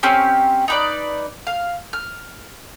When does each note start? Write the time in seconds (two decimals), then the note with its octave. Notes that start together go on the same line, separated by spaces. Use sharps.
0.03 C4 C#4 G4
0.68 D#4 B4 D5
1.47 F5
1.93 F6